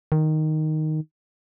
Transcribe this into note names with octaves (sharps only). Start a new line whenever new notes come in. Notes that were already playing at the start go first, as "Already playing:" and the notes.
D#3